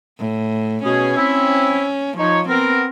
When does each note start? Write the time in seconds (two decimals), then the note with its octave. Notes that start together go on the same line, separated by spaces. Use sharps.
0.18 A2
0.84 B2 C#4 G#4
1.17 C4 E4
2.18 F3 D#4 C#5
2.48 B3 C4 A#4